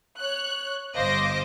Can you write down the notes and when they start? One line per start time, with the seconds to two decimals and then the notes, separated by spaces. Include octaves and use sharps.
0.20 C#5 F#6
0.95 G1 C5 D#5 F5 D6 A#6